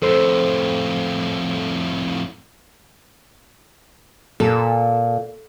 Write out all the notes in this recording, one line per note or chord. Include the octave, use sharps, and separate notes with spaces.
F2 A2 A4 C5
A#2 A4